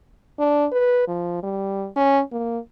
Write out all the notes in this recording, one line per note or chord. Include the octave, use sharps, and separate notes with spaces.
D4
B4
F3
G3
C#4
A#3